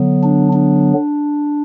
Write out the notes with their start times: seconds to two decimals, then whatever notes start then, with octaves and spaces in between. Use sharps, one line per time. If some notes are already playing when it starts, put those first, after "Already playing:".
Already playing: D3 F#3 B3
0.23 D4
0.53 D4